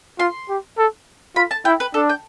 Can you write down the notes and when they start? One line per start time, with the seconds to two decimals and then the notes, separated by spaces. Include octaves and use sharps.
0.19 F4 C6
0.49 G4
0.78 A4
1.36 F4 B5
1.51 A5
1.65 E4 G5
1.80 B4
1.94 D4 A4
2.09 G5